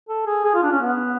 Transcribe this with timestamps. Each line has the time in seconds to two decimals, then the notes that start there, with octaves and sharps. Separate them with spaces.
0.09 A4
0.26 G#4
0.45 G#4
0.55 F4
0.63 D4
0.72 C#4
0.81 B3